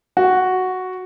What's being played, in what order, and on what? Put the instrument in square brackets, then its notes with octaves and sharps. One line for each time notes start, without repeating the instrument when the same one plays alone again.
[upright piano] F#4